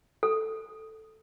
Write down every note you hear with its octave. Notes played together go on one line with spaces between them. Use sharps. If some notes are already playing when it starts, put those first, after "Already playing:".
A4